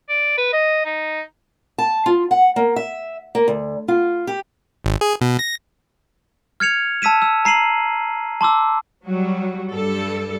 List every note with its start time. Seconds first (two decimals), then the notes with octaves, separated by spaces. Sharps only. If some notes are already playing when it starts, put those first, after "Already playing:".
0.09 D5
0.37 B4
0.53 D#5
0.85 D#4
1.78 A5
2.06 F4
2.31 F#5
2.56 A#3
2.76 E5
3.35 A#3
3.48 D2
3.88 F4
4.27 G4
4.85 G#1
5.01 G#4
5.21 B2
5.39 A#6
6.60 F6 G#6 C#7 F7
7.02 A5 E6 B6 D#7 E7
7.22 E6
7.45 A#5 C7 D#7 F#7
8.41 A5 C6 D6 E6
9.04 F#3 G3 F#4
9.71 G2 G3 A4